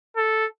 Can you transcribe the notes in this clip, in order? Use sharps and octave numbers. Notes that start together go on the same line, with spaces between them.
A4